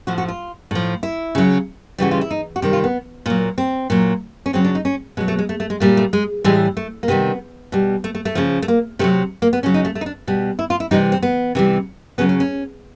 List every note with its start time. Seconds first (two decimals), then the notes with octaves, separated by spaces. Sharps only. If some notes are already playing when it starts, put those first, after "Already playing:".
0.07 A2 F3 F#4
0.18 F#4
0.28 F4
0.71 A2 F3
1.03 E4
1.35 C#3 F#3
1.98 C#3 E3 G3 F#4
2.11 F4
2.21 E4
2.31 D#4
2.56 F#4
2.62 C3 D#3 G3 G4
2.73 F4
2.84 B3
3.26 A#2 F#3 A#3
3.58 C4
3.90 A#2 F#3
4.46 C#4
4.53 C#3 F#3 C4
4.64 D4
4.75 D#4
4.85 C#4
5.17 B2 G#3
5.20 F#3
5.28 A3
5.39 G#3
5.49 A3
5.60 A3
5.70 G#3
5.80 A#2 G3 A3
5.97 A3
6.13 G#3
6.44 A2 E3 G3 G#3
6.77 A3
7.03 A#3
7.08 C3 D#3 G3 B3
7.72 B2 G3
8.04 A3
8.15 A3
8.25 A3
8.35 C#3 F3
8.62 A3
8.68 A#3
8.99 C3 D#3 F#3 A3
9.42 A#3
9.53 B3
9.63 C#3 F#3 C#4
9.74 D#4
9.85 A3
9.95 A3
10.01 D#4
10.06 D4
10.27 B2 G3
10.59 E4
10.70 F4
10.80 E4
10.91 C3 E3 G3 D#4
11.12 C4
11.23 B3
11.55 C3 E3 G3
12.18 C#3 F#3 B3
12.29 C#4
12.40 C#4